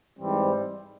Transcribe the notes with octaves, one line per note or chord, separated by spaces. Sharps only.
G#2 E3 G3 C4